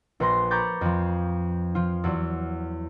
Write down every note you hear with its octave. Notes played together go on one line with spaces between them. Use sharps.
A#1 B4 C5 C6 A#6
A#5 B5 C#6 D6 G6 A6
F2 F3
F3 F4
E2 F#3